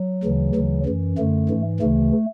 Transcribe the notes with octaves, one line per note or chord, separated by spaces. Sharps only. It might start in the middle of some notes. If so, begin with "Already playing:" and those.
Already playing: F#3
D2 C#3 E3
D2 C#3 E3
F#2 E3
F#2 D3 A3
G#2 E3
D2 C#3 E3 A3